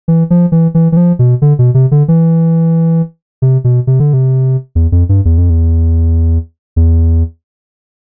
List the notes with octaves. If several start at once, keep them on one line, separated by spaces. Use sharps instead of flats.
E3
F3
E3
E3
E3
F3
B2
D3
B2
C3
D3
E3
C3
B2
C3
D3
C3
E2
F2
G2
E2
F2
E2
E2